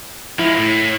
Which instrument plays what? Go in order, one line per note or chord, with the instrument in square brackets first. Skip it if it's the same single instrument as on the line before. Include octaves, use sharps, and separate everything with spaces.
[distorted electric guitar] F3 G#3 [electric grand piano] E4
[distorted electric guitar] A2